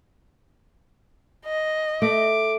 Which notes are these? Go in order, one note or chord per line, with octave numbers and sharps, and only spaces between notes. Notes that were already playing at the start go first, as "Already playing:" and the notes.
D#5
A3 D6